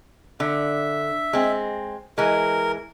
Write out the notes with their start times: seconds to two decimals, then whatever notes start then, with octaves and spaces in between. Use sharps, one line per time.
0.40 D3 E5
1.33 G#3 C4
2.18 E3 G#3 A#4